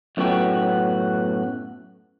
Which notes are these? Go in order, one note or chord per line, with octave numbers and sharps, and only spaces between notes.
F#2 A2 B3 F#4 G5